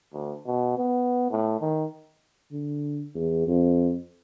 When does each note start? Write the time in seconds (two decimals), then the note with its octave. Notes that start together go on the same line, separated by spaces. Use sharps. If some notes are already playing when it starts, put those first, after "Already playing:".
0.13 D2
0.46 B2
0.78 B3
1.31 A2
1.61 D#3
2.52 D3
3.15 E2
3.48 F2